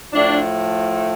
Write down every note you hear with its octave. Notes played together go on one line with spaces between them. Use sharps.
A2 F3 A3 D4